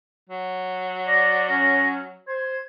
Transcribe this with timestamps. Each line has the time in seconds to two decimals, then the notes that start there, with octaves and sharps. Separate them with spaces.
0.30 F#3
1.07 D5 A#6
1.50 C#4
2.28 C5 G#6